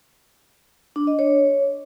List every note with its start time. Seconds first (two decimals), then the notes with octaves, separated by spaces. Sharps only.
0.96 D4
1.07 D#5
1.19 C#5